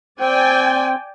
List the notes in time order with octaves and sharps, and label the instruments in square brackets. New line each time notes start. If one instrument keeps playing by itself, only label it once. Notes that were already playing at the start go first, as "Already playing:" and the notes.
[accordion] C4 [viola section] D5 G5 G#5